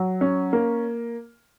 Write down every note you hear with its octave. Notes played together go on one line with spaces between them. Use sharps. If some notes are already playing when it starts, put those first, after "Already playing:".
Already playing: F#3
C#4
A#3